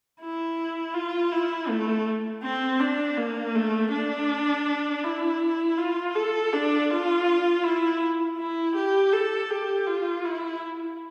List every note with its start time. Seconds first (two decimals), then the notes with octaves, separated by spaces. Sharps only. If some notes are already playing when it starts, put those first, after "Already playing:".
0.21 E4
0.94 F4
1.32 E4
1.69 A3
2.43 C4
2.80 D4
3.17 A#3
3.55 A3
3.92 D4
5.04 E4
5.77 F4
6.15 A4
6.53 D4
6.90 F4
7.63 E4
8.38 E4
8.76 G4
9.13 A4
9.50 G4
9.87 F4
10.24 E4